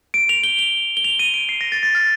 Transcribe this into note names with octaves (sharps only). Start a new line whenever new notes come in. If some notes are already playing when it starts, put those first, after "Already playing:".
D7
F7
G7
F7
G7
F7
D#7
D7
C7
A#6
A6
A6
F6